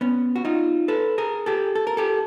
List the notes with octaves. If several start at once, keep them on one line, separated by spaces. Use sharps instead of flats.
B3 C#4
F#4
D#4 F4
A4 B4
G#4 A#4
G4 A4
A4
A#4
G4 A4